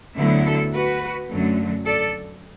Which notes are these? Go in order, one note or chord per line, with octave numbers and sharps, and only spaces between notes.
D2 D3 F#3 B3 E4
A4
F#4 B4
F#2 D3 F#3 A3
A4 D5